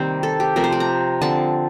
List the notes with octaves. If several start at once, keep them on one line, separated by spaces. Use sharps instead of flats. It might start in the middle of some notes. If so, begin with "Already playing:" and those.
Already playing: C3 D#3 G3 A#3 C4
A4
G4
C3 F3 A3 A#4
C5
D5
A#5
D3 F3 C4 A5